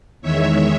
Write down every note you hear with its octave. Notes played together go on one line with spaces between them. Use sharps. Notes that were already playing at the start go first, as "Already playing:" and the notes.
E2 D#3 G#3 C#5 E5